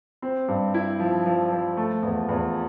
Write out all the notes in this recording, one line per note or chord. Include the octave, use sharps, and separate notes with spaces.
C4
G2
E4
F3
F3
F3
A3
E2
E2